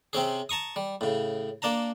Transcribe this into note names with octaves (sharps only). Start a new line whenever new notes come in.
C3 C4 C#4 G#4
A5 A#5 C#6 D#6
G3
A2 C#3
A#3 D4 A5 A#5